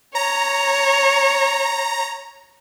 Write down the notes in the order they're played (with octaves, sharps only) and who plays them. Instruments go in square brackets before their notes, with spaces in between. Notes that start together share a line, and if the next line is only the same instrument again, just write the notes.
[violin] C#5 [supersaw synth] A#5